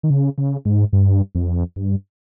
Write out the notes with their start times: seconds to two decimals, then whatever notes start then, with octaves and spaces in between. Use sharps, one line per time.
0.03 D#3
0.10 C#3
0.38 C#3
0.65 G#2
0.93 G2
1.35 F2
1.76 G2